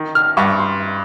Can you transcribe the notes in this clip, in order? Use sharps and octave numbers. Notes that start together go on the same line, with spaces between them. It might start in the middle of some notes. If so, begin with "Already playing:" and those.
Already playing: D#3
F6
G2 C#6
C6